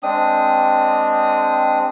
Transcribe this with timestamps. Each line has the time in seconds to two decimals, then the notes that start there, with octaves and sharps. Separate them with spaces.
0.03 G#3 C4 D4 D#6